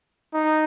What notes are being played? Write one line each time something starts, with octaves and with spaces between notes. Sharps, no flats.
D#4